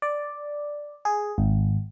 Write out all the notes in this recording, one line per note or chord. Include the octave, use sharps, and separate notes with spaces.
D5
G#4
G#1